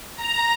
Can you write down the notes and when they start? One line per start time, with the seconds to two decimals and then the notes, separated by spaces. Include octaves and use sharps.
0.16 A#5